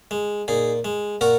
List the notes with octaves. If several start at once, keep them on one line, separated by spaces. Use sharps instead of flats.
G#3
A#2 D#4 G#4
G#3
A#2 F#4 A#4